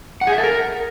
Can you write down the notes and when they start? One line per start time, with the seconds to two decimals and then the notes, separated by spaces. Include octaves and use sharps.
0.21 F#5
0.27 G#4
0.32 E5
0.38 A4
0.44 A#4